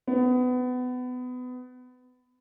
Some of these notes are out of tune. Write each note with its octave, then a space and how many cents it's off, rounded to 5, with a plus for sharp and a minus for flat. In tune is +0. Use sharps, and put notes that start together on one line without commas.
B3 +25